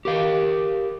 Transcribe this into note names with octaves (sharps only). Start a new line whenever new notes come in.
G4 A#4 F5